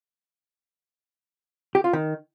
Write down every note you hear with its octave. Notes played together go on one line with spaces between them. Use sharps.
G4
F4
D#3